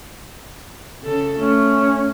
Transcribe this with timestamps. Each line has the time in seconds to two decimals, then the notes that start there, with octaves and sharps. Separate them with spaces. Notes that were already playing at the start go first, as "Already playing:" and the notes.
1.03 C#3 A4
1.39 A3 C#4